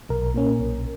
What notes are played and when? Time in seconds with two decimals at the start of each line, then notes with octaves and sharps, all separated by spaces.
0.09 B1 A#4
0.34 A#2 A#3 C#4
0.59 B1